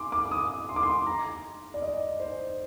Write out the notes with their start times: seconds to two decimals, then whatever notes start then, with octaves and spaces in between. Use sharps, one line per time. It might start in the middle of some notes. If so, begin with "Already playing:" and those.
Already playing: C6 D6
0.12 D6
0.31 D#6
0.69 C6
0.76 D6
0.83 C6
1.07 A#5
1.74 D5
1.82 D#5
2.20 C5